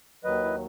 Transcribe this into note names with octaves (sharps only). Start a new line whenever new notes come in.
D#2 D#3 F#3 B4 D#5
E4